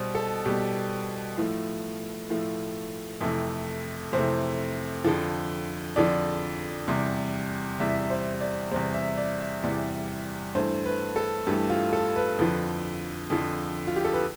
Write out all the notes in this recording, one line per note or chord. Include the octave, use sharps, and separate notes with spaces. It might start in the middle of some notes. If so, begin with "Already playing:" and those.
Already playing: B2 G3 C5
A4
B2 G3 G4
A2 F3 A3
A2 F3 A3
F2 C3 E3 A3
F2 C3 E3 A3 C5
F2 D3 F3
F2 D3 F3 D5
E2 C3 G3
E2 C3 G3 E5
C5
D5
E2 C3 E3 G3 C5
E5
D5
E5
E2 C3 E3 G3 D5
G2 E3 A3 C5
B4
A4
G2 E3 A3 G4
F4
A4
B4
F2 D3 F3
F2 D3 F3
F4
G4
A4
B4